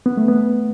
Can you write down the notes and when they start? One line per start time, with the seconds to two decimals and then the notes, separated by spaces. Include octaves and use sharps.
0.06 B3
0.17 A3
0.28 B3